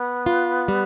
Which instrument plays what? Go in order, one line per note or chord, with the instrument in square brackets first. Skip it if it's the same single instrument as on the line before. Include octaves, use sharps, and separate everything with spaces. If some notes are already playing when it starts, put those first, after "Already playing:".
Already playing: [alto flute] B3
[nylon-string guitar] F4
G3